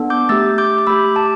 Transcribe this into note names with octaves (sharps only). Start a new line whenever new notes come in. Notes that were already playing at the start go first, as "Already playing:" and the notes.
Already playing: B3 D4 A4
D6 G6
A3 G4 E6 A6
D6 G6
D6
A3 G4 B5 E6
A5 D6